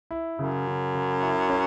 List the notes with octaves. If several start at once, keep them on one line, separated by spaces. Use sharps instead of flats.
E4
F#2 C#3
C#3
C#3
E4
C#4